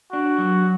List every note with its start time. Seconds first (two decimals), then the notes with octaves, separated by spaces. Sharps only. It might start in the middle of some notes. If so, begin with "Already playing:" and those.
0.13 D4 F#4
0.38 F#3